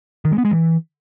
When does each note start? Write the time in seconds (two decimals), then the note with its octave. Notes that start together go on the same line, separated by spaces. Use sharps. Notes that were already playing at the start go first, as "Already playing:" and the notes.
0.25 D#3
0.31 G#3
0.38 B3
0.45 G#3
0.51 E3